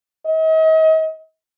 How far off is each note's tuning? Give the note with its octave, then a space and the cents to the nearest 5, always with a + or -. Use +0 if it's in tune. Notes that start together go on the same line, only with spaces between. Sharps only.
D#5 +40